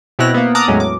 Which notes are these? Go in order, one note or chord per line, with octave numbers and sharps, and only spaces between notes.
B2 C4 E4 C#5 F#6 A#6
A#3 B3
A5 A#5 D6 D#6 F6 F#6
E2 A2 F#3 G#3 C#4
D6